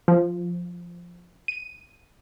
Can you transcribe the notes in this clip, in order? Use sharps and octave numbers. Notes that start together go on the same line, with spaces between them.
F3
D#7